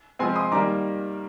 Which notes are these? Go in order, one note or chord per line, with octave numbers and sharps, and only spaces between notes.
F3 G#3 C4 G#5 C6
C6 D#6
D#3 G3 A#3 A#5 D6